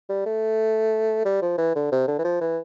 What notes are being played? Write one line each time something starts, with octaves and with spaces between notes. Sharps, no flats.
G3
A3
G3
F3
E3
D3
C3
D3
E3
F3
E3